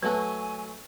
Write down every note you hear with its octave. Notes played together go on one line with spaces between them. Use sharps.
F#3 A3 F#4 B4 G#5 A5